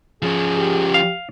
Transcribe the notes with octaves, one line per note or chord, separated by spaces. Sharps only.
F3 C#4 G#4
G4
F5